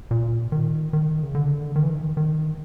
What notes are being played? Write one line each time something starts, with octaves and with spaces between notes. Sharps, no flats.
A#2
D#3
D#3
C#3
D3
D#3
E3
D#3
D#3